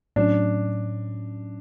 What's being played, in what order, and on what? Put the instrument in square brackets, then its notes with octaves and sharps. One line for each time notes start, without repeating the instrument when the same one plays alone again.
[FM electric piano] A2 F#3 C#4 [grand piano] D4